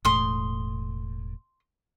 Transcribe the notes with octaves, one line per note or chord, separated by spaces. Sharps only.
E1 A2 C6 D#6